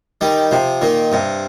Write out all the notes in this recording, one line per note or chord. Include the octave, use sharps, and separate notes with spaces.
D#3 G3
C3 F3
A#2 D#3
G2 C3